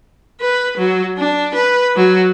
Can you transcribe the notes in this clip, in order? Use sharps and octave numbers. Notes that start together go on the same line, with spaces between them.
B4
F#3
D4
B4
F#3